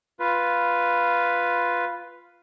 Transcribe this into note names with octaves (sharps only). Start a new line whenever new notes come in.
F4 B4